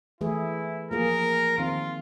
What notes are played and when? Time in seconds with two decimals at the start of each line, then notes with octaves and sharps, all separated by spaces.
0.21 E3 A3 E4 G#4
0.91 F3 A#3 G#4 A#4
1.58 D#3 C4 F4